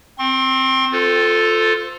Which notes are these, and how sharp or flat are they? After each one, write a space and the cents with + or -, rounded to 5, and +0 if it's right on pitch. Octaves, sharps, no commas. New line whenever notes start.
C4 +0 C6 +40
F4 +10 A4 +0 C5 -25